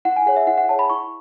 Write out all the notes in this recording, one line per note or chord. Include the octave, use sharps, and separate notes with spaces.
E4 F#5
G#5
G#4 C#5 F#5
E5
E4 F#5
F#5
G#4 C#5 A5
B5
E4 C#6